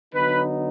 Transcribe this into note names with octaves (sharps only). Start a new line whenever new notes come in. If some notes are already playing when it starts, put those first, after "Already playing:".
D3 F#3 B3 D#4 B4